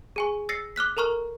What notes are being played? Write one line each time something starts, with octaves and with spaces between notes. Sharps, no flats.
G#4 G#5 C#6
E6 A6 A#6 C7 C#7
D6 F6 F#6 B6
A4 A#4 A#5 C#6 F6